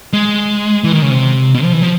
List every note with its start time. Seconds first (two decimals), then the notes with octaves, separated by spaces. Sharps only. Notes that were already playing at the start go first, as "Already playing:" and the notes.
0.13 G#3
0.84 E3
0.93 D#3
1.02 C#3
1.10 C3
1.54 B2
1.64 F3
1.73 E3
1.82 F3